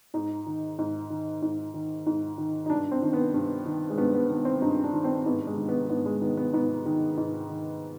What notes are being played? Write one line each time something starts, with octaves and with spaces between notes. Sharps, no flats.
G#2 D#4
D#3
G#2
D#3
G#2
D#3
G#2
D#3
D#4
G2 D4
C4
D#3
B3
G2
D#3
G#3
G2 B3
B3
D#3 B3
C4
G2 D#4
D4
D#3
C4
G#2 B3
G#3
D#3
B3
G#2 B3
G#3
D#3 B3
B3
G#2 B3
D#3
G#2
D#3